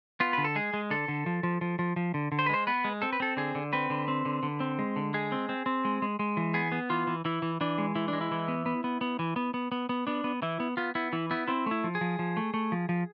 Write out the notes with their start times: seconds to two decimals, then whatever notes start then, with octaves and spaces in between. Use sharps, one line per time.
0.20 B3 F4
0.33 D3 B4
0.44 A4
0.56 G#3 G#4
0.74 G#3
0.90 D3 A4
1.08 D3
1.26 F3
1.43 F3
1.61 F3
1.79 F3
1.96 F3
2.14 D3
2.32 D3
2.39 C5
2.46 B4
2.49 G#3 C5
2.67 B3 B4
2.84 G#3
3.02 C4 A4
3.13 B4
3.20 C4 A4
3.37 D3 G#4
3.55 D3
3.73 C4 B4
3.90 D3
4.08 C4
4.25 D3
4.43 D3
4.60 C4
4.79 G#3
4.96 D3
5.14 G#3 G#4
5.32 C4
5.49 C4
5.66 C4
5.85 G#3
6.02 G#3
6.19 G#3
6.37 E3
6.54 B3 G#4
6.72 B3
6.90 E3 F4
7.07 E3
7.25 E3 E4
7.42 E3
7.61 E3 D4
7.78 G#3
7.95 E3 E4
8.08 D4
8.13 G#3
8.21 E4
8.31 E3
8.48 B3
8.66 B3
8.84 B3
9.01 B3
9.19 E3
9.36 B3
9.54 B3
9.72 B3
9.89 B3
10.07 B3 D4
10.24 B3
10.42 E3 E4
10.60 B3
10.77 B3 F4
10.95 B3 E4
11.13 E3 E4
11.31 B3 E4
11.48 C4 E4
11.66 A3 E4
11.84 F3
11.95 G#4
12.01 F3
12.19 F3
12.37 A3
12.54 A3
12.72 F3
12.89 F3